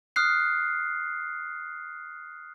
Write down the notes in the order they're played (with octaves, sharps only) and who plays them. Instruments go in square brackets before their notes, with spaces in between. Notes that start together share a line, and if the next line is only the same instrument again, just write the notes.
[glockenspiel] D#6 F6 F#6 C7